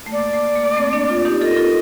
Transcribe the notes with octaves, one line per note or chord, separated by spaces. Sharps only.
A3
A#3 D5
A3
A#3
A3 C4
A#3 D4
D4 F4
D#4 G4
F4 A4 D#5
A#4
F4 A4